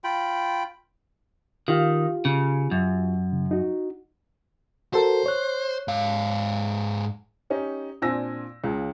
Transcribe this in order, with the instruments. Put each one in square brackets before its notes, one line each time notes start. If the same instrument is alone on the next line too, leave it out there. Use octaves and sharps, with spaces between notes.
[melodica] F4 G5 B5
[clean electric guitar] D#3 [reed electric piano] F4 G4 F5
[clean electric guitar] C#3
F#2
[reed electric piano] C#3
D#4 F#4
[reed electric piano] F#4 A4 A#4 [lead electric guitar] C5
[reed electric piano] C#5 F#6
[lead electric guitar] G#2 F5
[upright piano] C#4 D#4 G4
A#2 C4 D4 G#5 E6 A#6
C#2 C#3